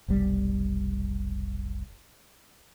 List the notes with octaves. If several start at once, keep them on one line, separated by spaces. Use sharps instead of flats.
F1 B1 G3